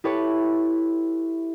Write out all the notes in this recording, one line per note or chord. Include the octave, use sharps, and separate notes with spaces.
E4 G4 A4 B4 C#5